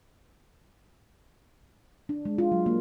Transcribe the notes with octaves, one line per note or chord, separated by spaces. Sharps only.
D4
G#3
F4
F#3
A#3